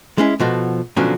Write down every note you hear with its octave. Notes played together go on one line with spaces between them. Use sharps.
G#3 C#4 E4
B2 F3 F#4 A4
B2 D3 F3 F#3 C4 C#4